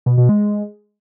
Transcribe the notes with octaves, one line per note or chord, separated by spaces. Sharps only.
B2
B2
G#3